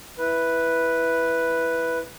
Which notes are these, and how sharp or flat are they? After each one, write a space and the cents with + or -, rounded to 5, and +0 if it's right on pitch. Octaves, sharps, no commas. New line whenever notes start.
E4 +0 B4 +0